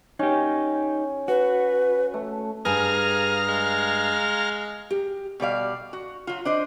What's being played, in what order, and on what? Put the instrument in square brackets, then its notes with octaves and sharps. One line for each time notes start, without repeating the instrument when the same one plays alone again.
[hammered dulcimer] C#4 [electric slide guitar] D#4 G4
[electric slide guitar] F#4 [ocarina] B4
[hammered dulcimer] A3
[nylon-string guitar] G2 G#5 [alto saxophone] G#4 [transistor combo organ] F5 A#5 F6
[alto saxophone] G#3
[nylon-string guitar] G4
[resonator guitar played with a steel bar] B2 G3 D5 F5
F#4
F#3 F4
D4 C5 D#5